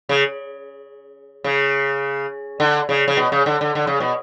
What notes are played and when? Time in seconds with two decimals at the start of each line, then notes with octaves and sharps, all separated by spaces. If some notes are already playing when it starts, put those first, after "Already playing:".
0.09 C#3
1.44 C#3
2.60 D3
2.89 C#3
3.08 C#3
3.17 B2
3.32 C#3
3.46 D3
3.61 D3
3.75 D3
3.87 C#3
4.00 B2